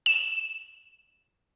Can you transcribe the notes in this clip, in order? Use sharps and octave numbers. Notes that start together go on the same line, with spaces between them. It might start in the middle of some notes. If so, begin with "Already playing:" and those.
E7